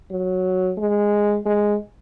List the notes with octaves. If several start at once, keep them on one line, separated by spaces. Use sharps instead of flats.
F#3
G#3
G#3